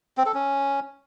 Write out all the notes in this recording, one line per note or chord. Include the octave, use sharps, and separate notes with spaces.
C4
A4
C#4